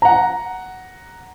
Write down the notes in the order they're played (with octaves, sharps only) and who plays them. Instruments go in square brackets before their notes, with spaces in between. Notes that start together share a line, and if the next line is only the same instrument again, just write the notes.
[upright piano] F#5 A#5